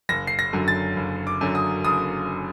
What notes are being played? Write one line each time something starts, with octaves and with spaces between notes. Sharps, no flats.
F#1 A#6
C7
A#6
F#2 D3 F#3
A6
F#1
D6
F#2 D3 F#3
D#6
F#1 D#6